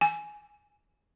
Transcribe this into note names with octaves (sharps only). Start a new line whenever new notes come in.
G#5